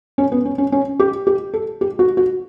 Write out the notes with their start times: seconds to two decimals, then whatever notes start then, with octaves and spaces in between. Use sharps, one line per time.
0.18 C#4
0.32 B3
0.45 C#4
0.58 C#4
0.72 C#4
1.00 G4
1.27 G4
1.54 A4
1.81 G4
1.99 F#4
2.17 F#4